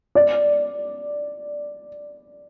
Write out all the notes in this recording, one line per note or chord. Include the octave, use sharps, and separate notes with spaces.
D5